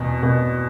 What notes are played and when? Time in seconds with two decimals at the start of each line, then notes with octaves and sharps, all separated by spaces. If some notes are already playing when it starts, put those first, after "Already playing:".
Already playing: E2 B2
0.23 B2